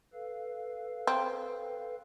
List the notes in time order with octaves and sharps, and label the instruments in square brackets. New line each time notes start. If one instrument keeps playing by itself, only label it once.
[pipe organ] A4 B4 F5
[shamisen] C4